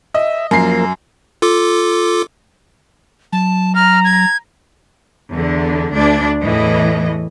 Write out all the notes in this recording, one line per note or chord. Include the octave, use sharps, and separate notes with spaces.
D#5 E5
F#2 F3 A#3 A#4 C7
F4 A4 D6
F#3 A5
A#5 F6
G#6
E2 D3
D2 D4 D5
E2 A2 E3 D#5